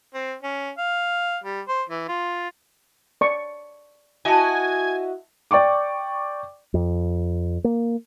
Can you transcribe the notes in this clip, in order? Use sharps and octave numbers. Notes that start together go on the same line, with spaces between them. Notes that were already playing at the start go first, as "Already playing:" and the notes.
C4
C#4
F5
G3
C5
E3
F4
D5 C#6
E4 F#4 D#5 G#5 A5
D5 G5 C#6 D6
F2
A#3